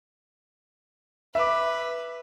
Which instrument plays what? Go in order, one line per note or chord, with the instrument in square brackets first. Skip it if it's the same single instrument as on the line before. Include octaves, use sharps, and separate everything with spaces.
[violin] B4 [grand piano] E5 D6